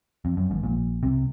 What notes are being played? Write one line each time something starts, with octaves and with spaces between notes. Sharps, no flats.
F2
F#2
G#1 G#2
A#1 A#2
C2 C3